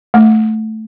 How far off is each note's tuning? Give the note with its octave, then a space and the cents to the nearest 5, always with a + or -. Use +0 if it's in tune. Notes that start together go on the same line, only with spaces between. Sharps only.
A3 -5